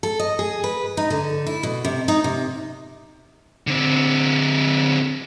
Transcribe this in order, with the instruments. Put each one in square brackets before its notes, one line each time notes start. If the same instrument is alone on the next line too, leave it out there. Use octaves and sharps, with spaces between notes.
[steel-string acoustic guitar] A4
D#5
G#4
B4
D#4
D3
E4
B2
C3
D#4
C3
[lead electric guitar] D3 C4